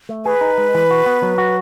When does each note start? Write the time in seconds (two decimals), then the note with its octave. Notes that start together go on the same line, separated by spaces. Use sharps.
0.09 A3
0.25 G#4 B4
0.41 D#4
0.58 G#3
0.74 E3
0.91 F#4
1.06 B3
1.23 F#3
1.38 F#4